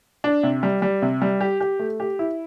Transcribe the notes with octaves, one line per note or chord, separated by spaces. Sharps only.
D4
C3
G3
G3
C3
G3
G4
G4
A3
G4
E4